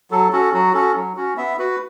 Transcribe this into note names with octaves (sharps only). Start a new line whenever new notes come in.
F#3 A4
C#4 F#4 A4
F#3 F#4
C#4 F#4 A4
F#3
C#4 F#4
B3 E5
F#4 B4